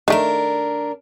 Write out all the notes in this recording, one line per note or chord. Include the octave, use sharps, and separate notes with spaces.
D#3 A3 D4 A#4